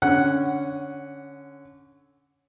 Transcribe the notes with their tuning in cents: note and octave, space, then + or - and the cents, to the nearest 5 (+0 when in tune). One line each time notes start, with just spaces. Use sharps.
D3 -10 C#4 +0 F#5 +0